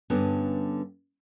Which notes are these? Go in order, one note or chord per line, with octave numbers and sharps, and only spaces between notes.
G2 D3 B3 C#4